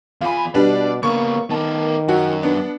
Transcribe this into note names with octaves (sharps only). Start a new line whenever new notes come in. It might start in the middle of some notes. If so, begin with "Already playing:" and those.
E2 F4 G#5 B5
B2 G3 D4 B4 D5
C#3 A#3 B3 C#6
D#3 B3 A#4 A5
F#2 F#4
B3 D4